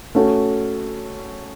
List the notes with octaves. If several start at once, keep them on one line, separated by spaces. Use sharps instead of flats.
A3 C#4 F#4 A4